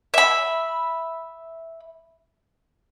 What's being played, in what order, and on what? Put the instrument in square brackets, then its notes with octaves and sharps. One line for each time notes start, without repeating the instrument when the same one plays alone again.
[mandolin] E5 B5